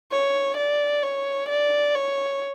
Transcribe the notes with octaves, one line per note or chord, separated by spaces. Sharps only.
C#5
D5
C#5
D5
C#5